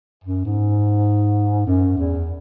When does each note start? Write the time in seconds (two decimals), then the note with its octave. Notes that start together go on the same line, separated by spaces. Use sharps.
0.24 F#2
0.45 G#2
1.67 F#2
1.98 E2